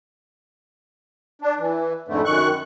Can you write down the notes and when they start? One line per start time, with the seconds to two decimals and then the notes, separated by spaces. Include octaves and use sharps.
1.42 D4
1.59 E3
2.08 F2 G#2 D3 A3
2.25 F#2 D#3 C#6 F#6